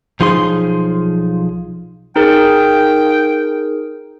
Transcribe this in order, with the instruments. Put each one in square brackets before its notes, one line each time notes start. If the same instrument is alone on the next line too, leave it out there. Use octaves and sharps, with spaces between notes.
[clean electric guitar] B1 F3 D#4 G#4 C6
[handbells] D#4 G#4 A#4 [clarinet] G5